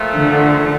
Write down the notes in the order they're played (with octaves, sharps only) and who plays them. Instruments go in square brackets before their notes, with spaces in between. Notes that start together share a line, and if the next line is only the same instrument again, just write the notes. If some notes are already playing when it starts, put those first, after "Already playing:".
Already playing: [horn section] A#2 F3 A3
[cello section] D3